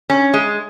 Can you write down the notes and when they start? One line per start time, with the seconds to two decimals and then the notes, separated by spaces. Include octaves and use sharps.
0.10 C#4
0.34 G#3